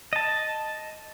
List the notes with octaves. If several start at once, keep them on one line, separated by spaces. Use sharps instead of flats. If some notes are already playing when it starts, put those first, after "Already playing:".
D#5 A5